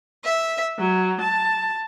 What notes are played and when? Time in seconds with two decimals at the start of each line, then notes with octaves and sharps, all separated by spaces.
0.24 E5
0.79 F#3
1.22 A5